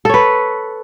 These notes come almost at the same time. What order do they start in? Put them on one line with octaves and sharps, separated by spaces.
A4 C#5 B4